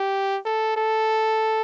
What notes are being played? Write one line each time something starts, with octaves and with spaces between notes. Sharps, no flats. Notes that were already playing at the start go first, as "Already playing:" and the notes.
Already playing: G4
A4
A4